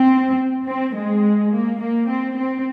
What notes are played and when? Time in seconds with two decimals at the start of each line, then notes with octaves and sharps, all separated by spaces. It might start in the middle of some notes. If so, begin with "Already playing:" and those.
Already playing: C4
0.68 C4
0.96 G#3
1.53 A#3
1.81 A#3
2.10 C4
2.37 C4